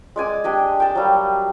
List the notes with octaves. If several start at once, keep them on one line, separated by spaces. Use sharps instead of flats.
G#3 D5 G#5 D6
D4 G4 D#5
G5 A5
F#3 G3 A#3